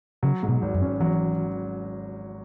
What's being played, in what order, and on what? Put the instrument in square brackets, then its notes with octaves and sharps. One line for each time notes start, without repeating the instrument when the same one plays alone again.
[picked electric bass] C#3 [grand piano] F#3
[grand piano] G#2
[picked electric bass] B2
[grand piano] G#1
[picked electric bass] F#2
[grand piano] C#4
[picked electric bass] E3 [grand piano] F#3